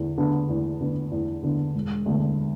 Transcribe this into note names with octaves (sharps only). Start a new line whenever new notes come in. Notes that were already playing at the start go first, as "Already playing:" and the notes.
Already playing: E2 D3
D3 B3 D4
E2
D3 B3 D4
E2
D3 B3 D4
E1
D2 D3 B3